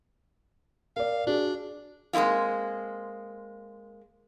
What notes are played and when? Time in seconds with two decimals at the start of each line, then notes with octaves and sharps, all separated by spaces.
0.96 A#4 D5 F5
1.27 D4 F#4 G#4
2.13 G#3 A#3 C4 E4 F4